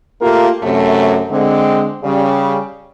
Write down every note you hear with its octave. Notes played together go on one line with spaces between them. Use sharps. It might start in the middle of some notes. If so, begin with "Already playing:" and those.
A3 A#3 F4 G4 A4 A#4
F#2 C3 A3
D3 G#3 C4
C#3 G3